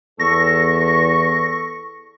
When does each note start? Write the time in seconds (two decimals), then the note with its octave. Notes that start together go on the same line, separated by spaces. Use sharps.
0.20 E2 A4 C#6 A#6